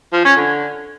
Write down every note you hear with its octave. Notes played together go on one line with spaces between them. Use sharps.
F3
C#4
D3